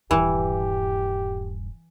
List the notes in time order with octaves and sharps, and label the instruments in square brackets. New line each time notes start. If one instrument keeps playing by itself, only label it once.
[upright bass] D#1 G2 [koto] E3 [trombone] G4